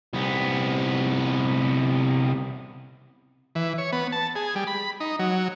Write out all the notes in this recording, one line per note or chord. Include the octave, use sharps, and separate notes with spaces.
C2 B3
E3
C#5
B3
A5
G#4
G3
B5
D#4
F#3